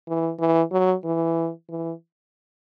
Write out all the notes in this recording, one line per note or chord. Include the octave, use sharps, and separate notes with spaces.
E3
E3
F#3
E3
E3